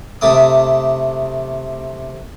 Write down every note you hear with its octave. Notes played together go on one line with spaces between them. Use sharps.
C3 A3 D6 D#6